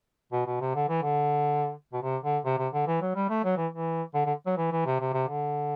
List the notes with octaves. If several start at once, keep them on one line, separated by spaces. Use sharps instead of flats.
B2
B2
C3
D3
E3
D3
B2
C3
D3
C3
C3
D3
E3
F#3
G3
A3
F#3
E3
E3
D3
D3
F#3
E3
E3
C3
C3
C3
D3